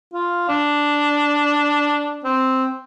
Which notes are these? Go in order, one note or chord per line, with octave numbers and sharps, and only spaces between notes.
F4
D4
C4